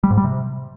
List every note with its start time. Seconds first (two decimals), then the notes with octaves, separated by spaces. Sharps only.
0.04 G3
0.10 G#2
0.17 G3
0.24 C3